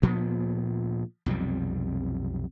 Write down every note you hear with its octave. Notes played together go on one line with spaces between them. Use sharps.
D2 A#2 F3 B3
B1 F2 C3 G3